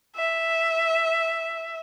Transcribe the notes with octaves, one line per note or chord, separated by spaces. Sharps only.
E5